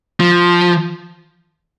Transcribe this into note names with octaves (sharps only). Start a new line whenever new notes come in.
F3